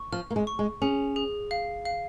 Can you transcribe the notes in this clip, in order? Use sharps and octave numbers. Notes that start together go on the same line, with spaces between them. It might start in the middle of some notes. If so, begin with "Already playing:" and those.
Already playing: C#6
F3 F6
A#3
G#3
C#6
G#3
C#4 G#4
G#4
F5
F5